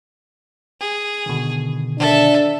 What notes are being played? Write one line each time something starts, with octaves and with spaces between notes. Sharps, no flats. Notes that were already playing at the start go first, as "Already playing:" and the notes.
G#4
B2 D3 D#3
D4 A4 E5